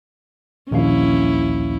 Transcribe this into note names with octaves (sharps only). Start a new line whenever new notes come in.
A#1 D#2 C#4 E4 F5